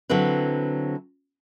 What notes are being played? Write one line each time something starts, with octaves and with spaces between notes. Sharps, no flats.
D3 F#3 C4 E4 B4